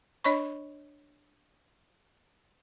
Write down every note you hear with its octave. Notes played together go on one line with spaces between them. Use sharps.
D4 C#5 D#5 B5 C#6